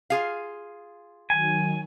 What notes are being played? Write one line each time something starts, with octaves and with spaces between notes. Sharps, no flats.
F4 G#4 F5
D#3 F#3 G#5